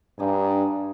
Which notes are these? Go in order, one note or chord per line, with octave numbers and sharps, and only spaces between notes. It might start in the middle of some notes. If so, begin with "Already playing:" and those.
G2 D4 D#4 G#4